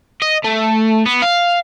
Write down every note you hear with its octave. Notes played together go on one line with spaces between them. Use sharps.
D#5
A3
B3
F5